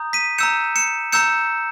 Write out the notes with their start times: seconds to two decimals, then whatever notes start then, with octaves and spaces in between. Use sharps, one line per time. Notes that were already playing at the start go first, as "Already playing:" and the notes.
Already playing: A#5 D#6 G6
0.13 B6 D#7
0.38 A#5 E6 G6 C#7 E7
0.76 C#7 E7
1.12 A#5 E6 G6 C#7 E7